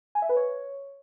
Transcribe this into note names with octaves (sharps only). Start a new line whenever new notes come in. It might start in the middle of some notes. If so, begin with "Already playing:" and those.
G#5
E5
B4
C#5